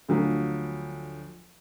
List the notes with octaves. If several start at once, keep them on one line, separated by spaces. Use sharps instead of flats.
D2 F3 F#3